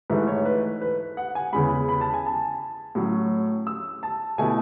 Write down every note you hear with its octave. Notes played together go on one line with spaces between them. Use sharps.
G#2 E3 A3 B4
C#5
B4
B4
F#5
G#5
E2 C#3 G#3 B5
B5
A5
G#5
A5
A2 F#3 C#4
E6
A5
B2 A3 E4 G#5